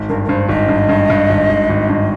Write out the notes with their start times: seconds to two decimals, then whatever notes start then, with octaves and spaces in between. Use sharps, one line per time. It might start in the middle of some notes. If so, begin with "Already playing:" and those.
Already playing: G#1
0.09 G2 A#4
0.24 A#4
0.29 G2 C5
0.49 G#1 D#5
0.69 G2
0.89 G2
1.10 G2
1.30 G#1
1.49 G#1
1.69 G#1
1.89 G2